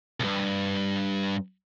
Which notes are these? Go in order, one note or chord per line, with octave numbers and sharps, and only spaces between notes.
C2 G2